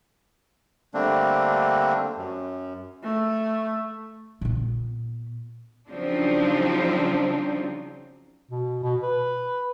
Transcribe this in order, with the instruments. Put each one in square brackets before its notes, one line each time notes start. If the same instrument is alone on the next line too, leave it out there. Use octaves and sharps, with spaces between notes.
[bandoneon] D3 G3 A3 A#3 C4 D4
F#2
[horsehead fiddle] A3
[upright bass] A#2 B3
[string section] C#3 F3 F#3 C4 D4 D#4
[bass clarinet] B2
B2
B4